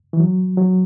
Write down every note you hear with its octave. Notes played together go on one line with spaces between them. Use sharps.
E3
F#3
F#3